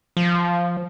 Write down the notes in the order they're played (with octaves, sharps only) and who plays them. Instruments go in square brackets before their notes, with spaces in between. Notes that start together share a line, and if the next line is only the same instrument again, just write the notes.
[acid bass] F3